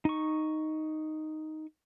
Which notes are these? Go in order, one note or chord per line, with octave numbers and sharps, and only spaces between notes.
D#4 C#6